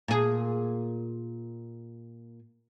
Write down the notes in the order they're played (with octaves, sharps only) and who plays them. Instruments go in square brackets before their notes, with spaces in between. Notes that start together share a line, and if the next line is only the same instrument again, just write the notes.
[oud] A#2 G#4